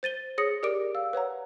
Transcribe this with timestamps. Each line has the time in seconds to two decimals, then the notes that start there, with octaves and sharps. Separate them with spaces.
0.03 C5 A6 D#7 G7
0.38 G#4 C#5 D#6 A#6 C#7
0.63 G4 A#4 D5 D6 D7
0.95 F5 E6
1.13 B4 C#5 F#5 A#5